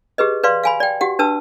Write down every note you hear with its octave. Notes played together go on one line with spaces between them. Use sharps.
G4 G#4 B4 D#5
B4 D5 F5 C6
F5 G#5 B5
D5 G5
F#4 G4 F#5
D4 B4 A5 E6